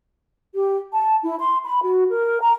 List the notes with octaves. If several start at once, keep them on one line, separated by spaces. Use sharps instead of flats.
G4
A5
E4
C6
B5
F#4
A#4
A#5